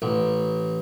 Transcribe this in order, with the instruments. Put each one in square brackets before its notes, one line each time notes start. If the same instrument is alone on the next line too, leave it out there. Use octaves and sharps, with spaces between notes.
[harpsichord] A1